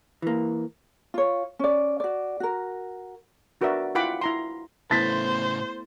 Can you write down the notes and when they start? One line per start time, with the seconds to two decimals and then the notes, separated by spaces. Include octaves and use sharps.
0.22 E3 A#3
1.14 F4 C#5
1.59 C#4 D5
2.00 F#4 D5
2.40 F#4 A#4
3.61 D4 F#4 A#4 B4 D5 E5
3.95 E4 F4 F#5 G5 B5 D6
4.21 E4 A#5 C6
4.91 A2 C#3 A3 B3 E4 C5 A6 B6